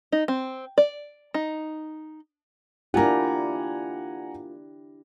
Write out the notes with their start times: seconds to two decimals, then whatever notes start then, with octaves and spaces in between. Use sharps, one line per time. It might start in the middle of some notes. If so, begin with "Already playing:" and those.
0.12 D#4
0.28 C4
0.78 D5
1.34 D#4
2.94 A#3 D4 E4 F4 G4 F#5 G#5 A#5